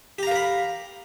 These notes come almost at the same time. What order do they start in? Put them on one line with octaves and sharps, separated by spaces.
G4 A#5 F5 A#4 B5